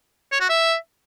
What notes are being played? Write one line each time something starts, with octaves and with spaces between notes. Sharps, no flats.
C#5
F#4
E5